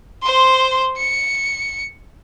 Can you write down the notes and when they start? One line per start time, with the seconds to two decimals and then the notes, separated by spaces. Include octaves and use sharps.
0.22 C5 C6
0.97 C#7